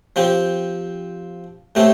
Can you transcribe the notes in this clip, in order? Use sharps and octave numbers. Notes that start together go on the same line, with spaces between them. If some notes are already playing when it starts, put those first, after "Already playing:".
F3 C4 G4
A2 A3 C4 G4